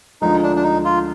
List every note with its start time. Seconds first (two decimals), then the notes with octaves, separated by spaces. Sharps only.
0.22 D2 D3 F3 G#3 D#4
0.43 D4
0.56 D4
0.63 D#4
0.85 F4